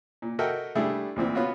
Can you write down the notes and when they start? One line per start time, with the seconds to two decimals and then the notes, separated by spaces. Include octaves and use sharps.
0.22 A#2
0.39 F#4 A4 A#4 D#5 E5 G5
0.75 G3 A3 D4 E4 G4 G#4
1.16 D2 A#2 E3 C4
1.35 B3 C#4 F4 F#4